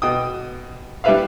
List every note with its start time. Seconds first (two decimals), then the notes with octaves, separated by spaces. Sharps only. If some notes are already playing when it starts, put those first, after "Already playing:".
0.02 B2 G5 D#6
1.04 G3 D4 E4 B4 E5 F5